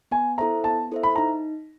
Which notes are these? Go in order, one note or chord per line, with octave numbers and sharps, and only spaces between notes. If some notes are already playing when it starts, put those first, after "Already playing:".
B3 G#5
E4 A4 C5 E5 A#5
B3 A5
E4 A4 C5 E5
B5
D#4 A#5